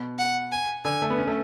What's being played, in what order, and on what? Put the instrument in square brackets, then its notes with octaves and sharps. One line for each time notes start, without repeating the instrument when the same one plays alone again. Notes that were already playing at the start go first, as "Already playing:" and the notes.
Already playing: [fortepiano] B2
[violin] F#5
G#5
[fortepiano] D3 [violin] G#5
[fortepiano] A3
B3
C#4
A3